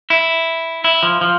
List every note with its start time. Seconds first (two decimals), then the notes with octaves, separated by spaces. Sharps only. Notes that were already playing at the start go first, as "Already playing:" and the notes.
0.10 E4
0.84 E4
1.03 F3
1.21 F3